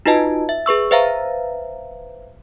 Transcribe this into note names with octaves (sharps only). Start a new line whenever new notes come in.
D#4 F4 F#4 B4 D#5 A5
E5
G#4 B4 C#6 E6
B4 C5 E5 F5 A#5